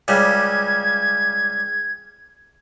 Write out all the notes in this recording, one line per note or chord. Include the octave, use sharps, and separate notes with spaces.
C#2 C#3 G3 G#6